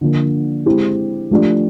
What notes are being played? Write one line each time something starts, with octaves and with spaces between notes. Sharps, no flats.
D3 F3 A#3
G#3 C4 E4 G4
F3 A3 D4 G4